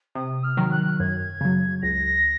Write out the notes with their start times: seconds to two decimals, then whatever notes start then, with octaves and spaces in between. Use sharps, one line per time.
0.15 C3 D#6
0.44 F6
0.57 D#3 F#3
0.71 F#6
1.00 F#2 G#6
1.41 C#3 F#3
1.82 C#2 A#6